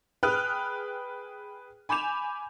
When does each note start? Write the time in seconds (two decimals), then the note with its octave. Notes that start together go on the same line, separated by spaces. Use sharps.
0.23 G#4 B4 G5 D#6 F6 F#6
1.89 G#5 B5 D6 G6 E7 F7